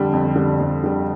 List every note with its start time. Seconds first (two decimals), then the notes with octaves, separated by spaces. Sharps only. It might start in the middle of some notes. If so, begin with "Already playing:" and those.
Already playing: F2 D3 G3
0.13 F2
0.36 D3 G3
0.59 F2
0.84 D3 G3